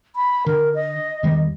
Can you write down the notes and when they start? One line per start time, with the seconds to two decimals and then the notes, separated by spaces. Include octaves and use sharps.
0.16 B5
0.46 D3 A#4
0.75 D#5
1.23 E2 D#3 G3